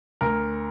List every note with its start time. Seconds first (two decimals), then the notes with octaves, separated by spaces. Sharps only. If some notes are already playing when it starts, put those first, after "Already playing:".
0.21 D2 A#4